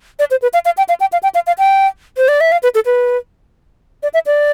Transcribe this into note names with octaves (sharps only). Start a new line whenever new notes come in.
D5
C5
B4
F5
F5
G5
F5
G5
F5
G5
F5
F5
G5
C5
D5
E5
F5
B4
A4
B4
D5
E5
D5